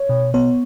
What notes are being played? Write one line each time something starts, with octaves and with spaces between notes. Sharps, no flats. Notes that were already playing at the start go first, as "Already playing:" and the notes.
Already playing: C#5
B2
B3 C#5